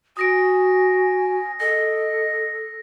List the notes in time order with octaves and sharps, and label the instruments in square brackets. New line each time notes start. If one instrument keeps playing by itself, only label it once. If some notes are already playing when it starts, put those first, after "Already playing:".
[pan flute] F#4 [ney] G#5 [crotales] D#6 A#6 D7
[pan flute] A4 [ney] D#5 [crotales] A#6